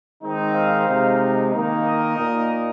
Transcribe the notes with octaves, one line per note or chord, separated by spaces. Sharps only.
D#3 G#3 C4 D#4
C5 F5
C3 G#3 D#4
D#3 A#3 D#4
A#4 D#5
A#2 A#3 D#4